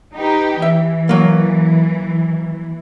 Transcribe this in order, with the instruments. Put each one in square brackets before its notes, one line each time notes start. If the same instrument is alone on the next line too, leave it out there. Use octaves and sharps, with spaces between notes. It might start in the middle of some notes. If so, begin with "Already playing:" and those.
[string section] D#4 G4 B4
[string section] E3 [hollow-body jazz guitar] E5
[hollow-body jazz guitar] F#3 A#3